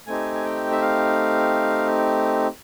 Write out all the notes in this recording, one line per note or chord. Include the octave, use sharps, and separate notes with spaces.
A3 C4 D#4 G4 G#5
G#5
G5
E5
F5